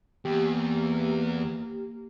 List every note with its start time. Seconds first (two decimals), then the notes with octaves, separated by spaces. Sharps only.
0.25 E2 A#3 G4